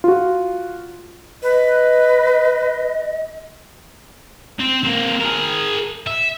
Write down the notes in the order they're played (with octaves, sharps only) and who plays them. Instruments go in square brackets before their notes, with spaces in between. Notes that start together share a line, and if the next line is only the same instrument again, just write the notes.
[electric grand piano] F4 F#4
[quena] B4 [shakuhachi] D#5
[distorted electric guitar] C4
A#3 C4
G#4 A#4
E5